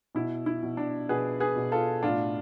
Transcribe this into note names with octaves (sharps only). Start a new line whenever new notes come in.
B2 E4
E4
B2
D4
B2 G#4 B4
G#4 B4
B2
F4 A4
A2 D4 F4